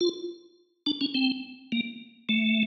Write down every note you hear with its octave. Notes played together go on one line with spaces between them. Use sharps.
F4
D4
C#4
C4
A#3
A3